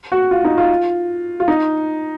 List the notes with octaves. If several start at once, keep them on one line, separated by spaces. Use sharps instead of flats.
F#4
F4
D#4
F4
F4
D#4